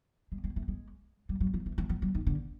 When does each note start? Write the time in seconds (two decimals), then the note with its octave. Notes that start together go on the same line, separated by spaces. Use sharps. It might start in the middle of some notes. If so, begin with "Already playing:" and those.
0.32 G#3
0.44 G#3
0.56 A3
0.68 G#3
1.29 G3
1.40 F#3
1.54 F3
1.66 E3
1.78 E3
1.89 F3
2.02 F#3
2.15 D#3
2.27 D3